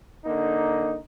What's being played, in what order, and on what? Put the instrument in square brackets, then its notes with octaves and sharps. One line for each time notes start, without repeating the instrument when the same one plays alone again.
[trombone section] D3 A#3 D#4